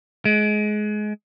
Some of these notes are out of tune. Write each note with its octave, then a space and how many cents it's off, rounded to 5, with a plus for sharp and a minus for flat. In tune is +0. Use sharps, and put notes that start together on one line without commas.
G#3 +20